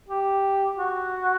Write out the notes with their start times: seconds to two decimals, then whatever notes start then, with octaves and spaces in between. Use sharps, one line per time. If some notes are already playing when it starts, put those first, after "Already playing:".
0.09 G4
0.76 F#4